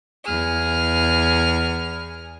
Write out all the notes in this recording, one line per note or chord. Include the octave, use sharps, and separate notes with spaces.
E2 G#4 F6